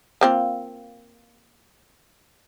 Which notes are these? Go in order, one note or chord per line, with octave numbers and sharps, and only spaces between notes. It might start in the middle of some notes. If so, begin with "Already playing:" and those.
A#3 C4 F4